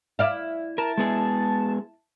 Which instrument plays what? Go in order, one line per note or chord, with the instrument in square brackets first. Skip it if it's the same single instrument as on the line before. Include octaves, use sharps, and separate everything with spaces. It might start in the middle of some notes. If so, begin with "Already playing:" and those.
[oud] E4 D5 F5
[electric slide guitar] A#4 [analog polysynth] A5
[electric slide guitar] G#3 B3 G#4